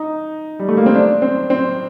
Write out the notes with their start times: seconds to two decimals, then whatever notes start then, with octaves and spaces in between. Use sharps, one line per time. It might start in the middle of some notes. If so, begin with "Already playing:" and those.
Already playing: D#4
0.60 G3
0.68 A3
0.77 A#3
0.86 C4
0.95 D4
1.22 C4
1.50 C4